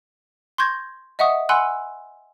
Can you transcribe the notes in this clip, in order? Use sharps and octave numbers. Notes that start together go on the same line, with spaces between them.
C6 C#6 G6 G#6 A#6
D#5 E5 F#5 C#6 D#6
F#5 G#5 B5 C6 E6 F#6